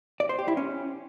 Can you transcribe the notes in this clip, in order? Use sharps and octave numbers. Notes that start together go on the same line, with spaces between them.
D5
C5
G4
E4
C#4